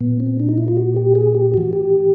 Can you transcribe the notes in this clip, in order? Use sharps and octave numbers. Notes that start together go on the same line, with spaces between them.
A#2 B3
C4
D4
D#4
E4
F4
F#4
G4
G#4
G4
A2 E3 F#4
G4